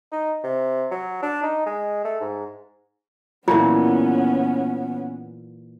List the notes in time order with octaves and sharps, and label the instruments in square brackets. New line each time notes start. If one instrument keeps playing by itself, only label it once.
[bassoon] D#4
C3
F#3
D4
D#4
G#3
A3
G#2
[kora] A#2 E3 F#3 [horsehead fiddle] B3 C#4 [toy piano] F4